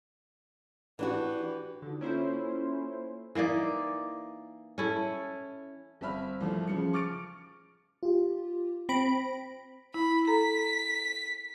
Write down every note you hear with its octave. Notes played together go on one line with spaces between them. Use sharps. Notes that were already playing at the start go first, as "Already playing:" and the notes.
E3 D4 F#4 G4 B4
D3 D#4 F4 F#4
A#3 C#4 E4 F4 A4 C5 C#5
E3 A#3 D#4 D5
C#4 E4 A4
G1 C4 E5 B5 F6
C2 E3 F3 A3
C#3 F3 C#7
C#6 D6 F6 A6 C#7 D7
F4 G4
C4 B5 A#6 D7
E4 B5
A4 A#5 B6